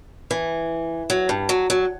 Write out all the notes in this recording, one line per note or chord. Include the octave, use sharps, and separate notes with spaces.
E3
F#3
G2
F#3
F#3